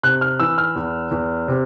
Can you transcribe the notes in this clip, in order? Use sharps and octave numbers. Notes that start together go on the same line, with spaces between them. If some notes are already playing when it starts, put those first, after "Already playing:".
C3 F#6
F6
E3 E6
F6
E2
E2
C3